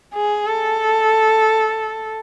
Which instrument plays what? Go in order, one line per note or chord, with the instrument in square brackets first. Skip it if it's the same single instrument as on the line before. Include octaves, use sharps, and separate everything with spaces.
[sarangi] G#4
A4